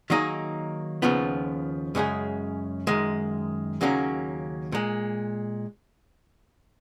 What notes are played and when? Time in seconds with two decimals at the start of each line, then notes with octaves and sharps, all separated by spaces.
0.10 D#3 F#3 A#3 D#4 G#4
1.02 D#2 C#3 F3 B3 F4
1.95 F#2 C#3 G#3 C#4 G#4
2.87 F#2 D#3 G#3
3.81 D#2 C#3 F#3 A#3 C#4
4.72 A#2 G#3